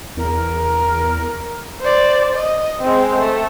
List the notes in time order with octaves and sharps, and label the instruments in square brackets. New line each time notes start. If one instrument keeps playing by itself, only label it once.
[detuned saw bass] E2 [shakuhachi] A#4
[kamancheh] C5 D5
D#5
G#3 C4
A3